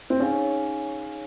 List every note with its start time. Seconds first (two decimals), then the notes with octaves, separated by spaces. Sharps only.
0.10 C4
0.20 C#4 D#4 G#4 C#5 F5 G#5